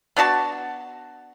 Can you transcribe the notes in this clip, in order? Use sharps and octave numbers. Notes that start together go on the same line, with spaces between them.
B3 D4 F#4 A5